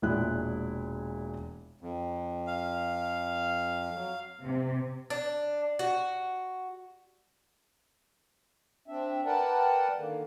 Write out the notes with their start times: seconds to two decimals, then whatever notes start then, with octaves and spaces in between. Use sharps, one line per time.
0.02 E1 A#2 G#3 E4 G#4 F#6
1.81 F2
2.47 F5
3.96 F#3
4.43 C3
5.10 D4
5.79 F#4
8.88 C4 D4 E5
9.25 A#4 B4 D5 F#5 G5 A5
9.95 D3 D#3 A#3